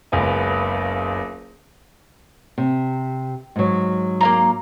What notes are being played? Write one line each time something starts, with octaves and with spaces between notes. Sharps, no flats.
F#1 C#2 B3 G#5
C3
G#2 F#3
A#3 F5 A#5